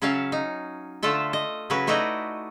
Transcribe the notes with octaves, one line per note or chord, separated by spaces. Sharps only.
C#3 F#3 C#4 E5 F5 A5
D#4
D3 A3 F4 A4 E5
D#5
C#3 F#3 C#4 F#4 B4
A3 D#4 E4 F#4 D5 D#5